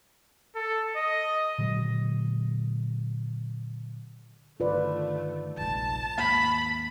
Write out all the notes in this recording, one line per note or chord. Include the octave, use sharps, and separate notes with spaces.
A4
D#5
A#2 D3 F#3 G#3
G2 D3 D#3 A3 F4 B4 D5
F1 A#1 G#2 A5
D#2 G#2 A#3 B5